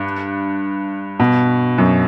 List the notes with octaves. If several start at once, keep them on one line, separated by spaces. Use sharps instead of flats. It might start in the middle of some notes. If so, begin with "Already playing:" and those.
Already playing: G2
B2
F#2